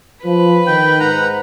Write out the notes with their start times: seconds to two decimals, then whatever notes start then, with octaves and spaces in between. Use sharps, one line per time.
0.24 F3 B4
0.67 D#3 G5
1.00 G#2 F#5 A#5